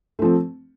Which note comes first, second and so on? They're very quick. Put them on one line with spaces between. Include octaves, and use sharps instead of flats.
A3 F3 C4